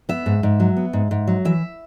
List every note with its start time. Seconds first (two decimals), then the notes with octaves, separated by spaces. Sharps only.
0.09 B3 E5
0.26 G#2
0.43 G#2
0.60 F#3
0.77 B3
0.93 G#2
1.11 G#2
1.28 F#3
1.45 E3 E5